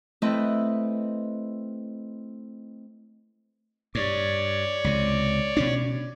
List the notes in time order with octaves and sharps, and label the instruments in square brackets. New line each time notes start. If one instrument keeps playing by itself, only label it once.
[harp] A3 C4 E4 B4 D#5
[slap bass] G2 [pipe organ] C#5 D5
[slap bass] C#2 C3
B2 C#4 D4